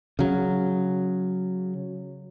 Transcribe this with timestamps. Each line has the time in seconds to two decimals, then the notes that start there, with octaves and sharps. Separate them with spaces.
0.19 C#3 F#3